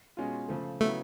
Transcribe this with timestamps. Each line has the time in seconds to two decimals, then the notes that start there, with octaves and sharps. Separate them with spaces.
0.17 B2 G#3 C#4 F4
0.49 C#3 F3 A3
0.81 C#3 F#3 A3 B3 E4